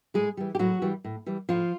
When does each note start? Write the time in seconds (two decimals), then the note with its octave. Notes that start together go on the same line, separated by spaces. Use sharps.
0.14 A2 G#3 G#4
0.37 E3 G3
0.55 G4
0.59 A2 F#3 F#4
0.82 E3 G3
1.04 A2
1.26 E3 G3
1.49 A2 F3 F4